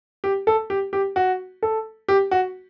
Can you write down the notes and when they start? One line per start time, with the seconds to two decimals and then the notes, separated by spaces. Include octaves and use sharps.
0.24 G4
0.47 A4
0.70 G4
0.93 G4
1.16 F#4
1.63 A4
2.09 G4
2.31 F#4